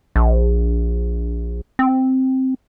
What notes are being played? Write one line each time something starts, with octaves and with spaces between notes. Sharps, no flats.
A#1
C4